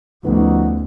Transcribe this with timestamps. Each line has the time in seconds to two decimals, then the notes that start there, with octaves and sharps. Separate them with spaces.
0.25 D2 F3 A3 B3 C#4 D#4 F#4